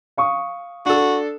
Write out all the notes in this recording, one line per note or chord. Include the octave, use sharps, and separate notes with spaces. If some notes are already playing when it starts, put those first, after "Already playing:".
F5 C#6 D#6
D4 F#4 A4